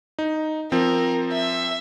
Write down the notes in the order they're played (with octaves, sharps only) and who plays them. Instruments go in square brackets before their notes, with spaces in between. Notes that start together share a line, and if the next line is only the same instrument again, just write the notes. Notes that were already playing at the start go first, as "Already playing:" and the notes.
[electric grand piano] D#4
[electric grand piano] F3 C4 [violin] A#4
[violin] E5